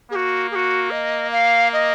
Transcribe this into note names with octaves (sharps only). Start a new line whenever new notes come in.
A#3 F#4 G#4
G#4
F#4
D#5
F5
D#5